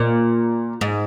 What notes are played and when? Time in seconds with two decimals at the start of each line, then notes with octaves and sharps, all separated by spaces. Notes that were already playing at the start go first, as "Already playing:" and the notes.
Already playing: A#2
0.81 G#2